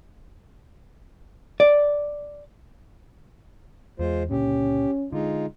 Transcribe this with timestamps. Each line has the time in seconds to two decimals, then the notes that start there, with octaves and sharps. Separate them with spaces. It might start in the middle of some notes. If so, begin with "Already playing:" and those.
1.60 D5
4.00 E2 G#3 F4 C5
4.31 C#2 A#2 D3 C#4 G4
5.13 D3 G#3 D#4 F4